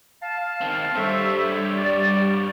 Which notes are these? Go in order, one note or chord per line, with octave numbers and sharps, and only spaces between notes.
F5 A5
D#3 C4
G2 G3 A4 C5 C#5 E5
D5